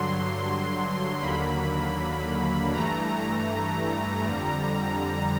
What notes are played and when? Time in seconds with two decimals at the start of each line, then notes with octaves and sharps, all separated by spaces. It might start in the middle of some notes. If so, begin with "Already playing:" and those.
Already playing: G2 D3 F#3 C6
1.20 D#2 D3 F#3 A#3 B5
2.73 G2 E3 A3 A#5
4.25 F2 D3 G3